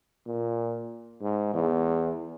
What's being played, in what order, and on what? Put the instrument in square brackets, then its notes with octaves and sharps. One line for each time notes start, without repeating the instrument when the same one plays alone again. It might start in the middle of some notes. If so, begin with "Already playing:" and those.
[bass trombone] A#2
G#2
E2